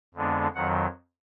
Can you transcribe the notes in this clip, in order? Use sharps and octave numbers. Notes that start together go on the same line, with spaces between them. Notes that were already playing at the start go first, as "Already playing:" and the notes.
F2 D3 G#3 B3 D4
F2 D#3 F#3 F#5